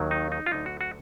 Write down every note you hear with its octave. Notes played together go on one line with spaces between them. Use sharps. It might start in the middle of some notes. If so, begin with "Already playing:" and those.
Already playing: D#2 D#3 F#3
D#4
D#4
F4
D2 D3 F#3 D#4
F#4
F#4